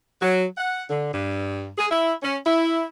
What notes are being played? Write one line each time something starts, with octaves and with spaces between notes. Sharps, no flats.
F#3
F#5
D3
G2
G#4
E4
C#4
E4